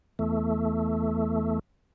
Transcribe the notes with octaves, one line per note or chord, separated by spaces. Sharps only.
E2 A3